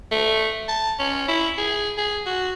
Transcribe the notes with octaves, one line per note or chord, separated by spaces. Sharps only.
A3
A5
C#4
E4
G#4
G#4
F#4